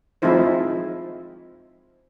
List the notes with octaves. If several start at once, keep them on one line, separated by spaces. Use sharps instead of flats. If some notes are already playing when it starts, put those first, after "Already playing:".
F3 G#3 C4 D#4 E4 C5